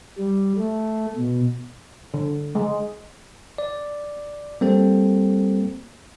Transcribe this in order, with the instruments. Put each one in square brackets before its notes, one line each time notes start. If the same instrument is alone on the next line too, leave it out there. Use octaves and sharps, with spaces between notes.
[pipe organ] G3
A3
B2
[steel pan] D3
G#3
[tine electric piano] D5
G3 A#3 C4 A4